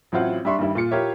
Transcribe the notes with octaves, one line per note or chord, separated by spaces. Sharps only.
A1 F#3 C4 E4 F4 F#5
G3 D4 E5 C6 C#6
G2 D#3 G3 E4
A#2 F4 C#7
E4 F4 G4 A#4 C#5 E5